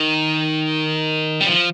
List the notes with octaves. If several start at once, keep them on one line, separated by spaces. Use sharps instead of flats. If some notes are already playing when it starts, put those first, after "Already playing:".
Already playing: D#3
G3
F3